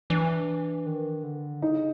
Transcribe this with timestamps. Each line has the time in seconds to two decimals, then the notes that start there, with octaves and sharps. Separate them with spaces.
0.10 E3 D4
0.86 D#3
1.24 D3
1.62 C#3 D#4